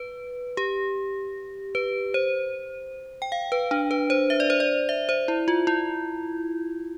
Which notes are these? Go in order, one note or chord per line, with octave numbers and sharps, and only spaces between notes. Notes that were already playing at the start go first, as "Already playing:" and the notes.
Already playing: B4
G4
B4
C5
G5
F5
B4
D4
B4
C5
E5
D5
C5
D5
E5
C5
E4
F4
E4